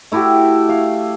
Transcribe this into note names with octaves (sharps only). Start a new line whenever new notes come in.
A3 E4 F#4 G4
F5